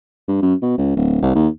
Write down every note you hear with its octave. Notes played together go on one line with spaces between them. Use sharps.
G2
F#2
B2
C#2
D1
C2
D#2